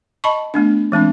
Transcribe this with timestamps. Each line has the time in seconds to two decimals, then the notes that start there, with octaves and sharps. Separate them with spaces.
0.24 D#5 A5 B5 C#6
0.54 A3 B3 D4
0.92 E3 G#3 C4 D4